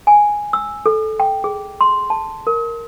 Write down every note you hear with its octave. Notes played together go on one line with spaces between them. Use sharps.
G#5
E6
A4
G5
G#4
C6
A5
A#4